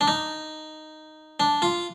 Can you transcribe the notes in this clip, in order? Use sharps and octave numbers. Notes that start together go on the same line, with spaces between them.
D4
D#4
D4
F4